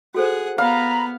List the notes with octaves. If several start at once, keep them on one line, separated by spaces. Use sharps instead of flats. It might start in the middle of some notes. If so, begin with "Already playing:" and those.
F#4 G#4 A4 C5 F#5
B3 F5 A#5 B5